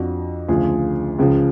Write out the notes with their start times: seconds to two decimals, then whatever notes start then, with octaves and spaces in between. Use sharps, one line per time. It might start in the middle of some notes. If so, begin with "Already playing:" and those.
Already playing: F2 F3 D4 F#4
0.49 D2 C#3 F3 F4 G#4
1.19 C#2 C#3 F3